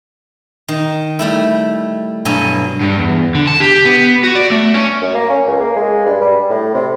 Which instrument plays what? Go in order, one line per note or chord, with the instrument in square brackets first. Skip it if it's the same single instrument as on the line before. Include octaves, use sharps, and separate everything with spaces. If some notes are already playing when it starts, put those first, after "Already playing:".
[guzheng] D#3
G3 A3 E4
G2 B2 F#3 A4 G#5
[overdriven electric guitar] G2
E2
D3
A5
G4
B3
F#4
D5
A3
C#4
[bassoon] F#2
A#3
C#4
C#2
A#3
G#3
G2
G3
A2
C3